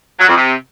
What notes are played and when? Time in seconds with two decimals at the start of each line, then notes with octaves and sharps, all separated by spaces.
0.20 F#3
0.28 F2
0.37 C3